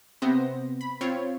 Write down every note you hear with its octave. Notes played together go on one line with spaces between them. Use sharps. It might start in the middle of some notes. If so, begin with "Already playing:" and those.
C3 B3 C4 C5 A#6
B5
C4 F4 C#5